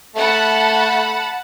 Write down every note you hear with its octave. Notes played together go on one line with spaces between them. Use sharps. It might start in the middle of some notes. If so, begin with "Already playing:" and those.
A3 F#5 A5 B5